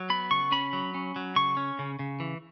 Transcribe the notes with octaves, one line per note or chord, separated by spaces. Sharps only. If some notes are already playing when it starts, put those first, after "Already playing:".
Already playing: F#3
B3 B5
C#3 C#6
C#4 B5
F#3
C#4
F#3
C#3 C#6
C#4
C#3
C#3
E3